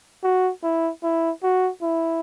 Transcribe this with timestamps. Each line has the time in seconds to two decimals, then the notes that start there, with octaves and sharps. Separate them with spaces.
0.24 F#4
0.63 E4
1.03 E4
1.43 F#4
1.82 E4